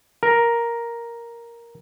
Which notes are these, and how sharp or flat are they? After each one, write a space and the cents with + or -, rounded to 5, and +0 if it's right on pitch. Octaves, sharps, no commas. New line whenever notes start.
A#4 +5